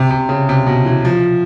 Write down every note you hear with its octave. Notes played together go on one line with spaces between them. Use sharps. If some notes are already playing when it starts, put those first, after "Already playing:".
Already playing: C3
C3
C#3
C3
B2
E3
F3